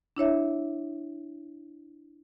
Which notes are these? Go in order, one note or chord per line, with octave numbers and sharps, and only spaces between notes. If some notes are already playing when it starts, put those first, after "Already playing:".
D4 E4 C#5 E5